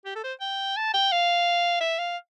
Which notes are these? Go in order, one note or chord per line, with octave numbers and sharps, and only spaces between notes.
G4
A4
C5
G5
A5
G5
F5
E5
F5